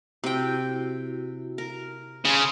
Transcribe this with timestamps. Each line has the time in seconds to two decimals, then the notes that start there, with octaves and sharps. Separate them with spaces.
0.24 C3 E4 F#4 G5
1.58 A#4
2.25 C#3 G#5 C6